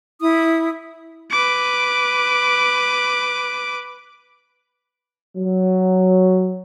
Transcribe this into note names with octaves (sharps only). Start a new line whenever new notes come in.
E4 D#6
B4 D6
F#3